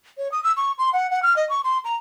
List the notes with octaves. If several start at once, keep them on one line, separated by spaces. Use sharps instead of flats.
C#5
D#6
E6
C#6
C6
F#5
F#5
F6
D#5
C#6
C6
A#5